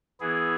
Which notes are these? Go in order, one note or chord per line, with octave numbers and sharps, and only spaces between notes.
E3 B3 E4 G#4